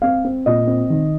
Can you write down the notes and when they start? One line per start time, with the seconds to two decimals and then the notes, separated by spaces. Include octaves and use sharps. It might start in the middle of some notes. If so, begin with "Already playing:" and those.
0.02 C4 F5
0.25 C4
0.46 A#2 D#5
0.67 C4
0.90 D#3